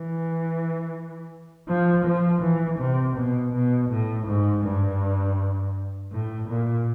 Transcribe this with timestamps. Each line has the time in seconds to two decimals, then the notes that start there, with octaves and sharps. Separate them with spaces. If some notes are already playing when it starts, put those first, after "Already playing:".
Already playing: E3
1.68 F3
2.05 F3
2.42 E3
2.79 C3
3.16 B2
3.54 B2
3.90 A2
4.27 G#2
4.64 G2
6.12 A2
6.49 A#2